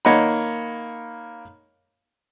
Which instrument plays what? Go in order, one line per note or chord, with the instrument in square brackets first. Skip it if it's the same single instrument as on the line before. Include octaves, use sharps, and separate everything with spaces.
[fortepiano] D#3 A#3 C#5 D#5 F#5 B5